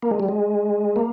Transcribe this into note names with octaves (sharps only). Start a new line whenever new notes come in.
A#3
G#3
G3
G#3
A#3